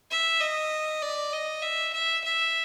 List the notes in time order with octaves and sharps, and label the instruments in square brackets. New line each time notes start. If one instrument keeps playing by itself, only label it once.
[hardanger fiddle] E5
D#5
D5
D#5
E5
E5
E5